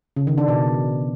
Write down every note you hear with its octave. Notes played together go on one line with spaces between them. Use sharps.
C#3
D#3
D4
B2